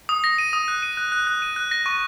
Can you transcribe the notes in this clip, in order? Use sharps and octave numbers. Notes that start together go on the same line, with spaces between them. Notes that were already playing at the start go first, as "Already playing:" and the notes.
D#6
A#6
D#7
D#6
F#6
D#7
F#6
F#6
F#6
D#7
F#6
A#6
C#6